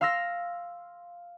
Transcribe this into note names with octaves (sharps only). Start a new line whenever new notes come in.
F5 C6 E6 F6 A#6